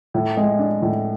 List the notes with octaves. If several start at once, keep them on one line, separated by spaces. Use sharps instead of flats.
A2
G#3
D4
A2